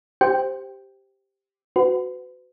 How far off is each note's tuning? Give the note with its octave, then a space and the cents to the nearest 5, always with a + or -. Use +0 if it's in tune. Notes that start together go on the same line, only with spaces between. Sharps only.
G4 +0 C5 +0 G5 +0
F#4 +0 B4 +40